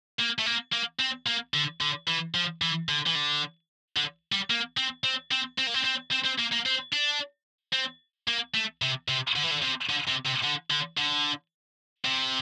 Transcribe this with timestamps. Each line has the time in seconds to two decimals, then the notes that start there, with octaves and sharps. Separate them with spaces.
0.19 A#3
0.39 A3
0.46 A#3
0.73 A#3
1.00 C4
1.27 A#3
1.54 D3
1.81 D3
2.08 E3
2.34 F3
2.62 E3
2.89 D3
3.07 E3
3.15 D3
3.96 D3
4.32 G3
4.50 A#3
4.77 C4
5.04 C4
5.31 C4
5.58 C4
5.67 A#3
5.74 C4
5.85 C4
6.12 C4
6.25 C4
6.39 A#3
6.52 A#3
6.66 C4
6.93 D4
7.73 C4
8.28 A#3
8.55 A3
8.82 C3
9.08 C3
9.36 D3
9.43 E3
9.51 D3
9.62 C3
9.89 D3
10.08 C3
10.26 C3
10.43 D3
10.70 D3
10.98 D3
12.05 C3